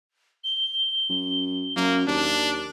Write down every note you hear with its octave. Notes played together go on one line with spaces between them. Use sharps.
G7
F#2
F#2 A#3
D#2 D4